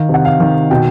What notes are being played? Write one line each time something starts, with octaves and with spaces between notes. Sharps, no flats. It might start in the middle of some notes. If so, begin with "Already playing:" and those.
Already playing: D#3 F5
C3
F#5
F5
D#3
B2 G5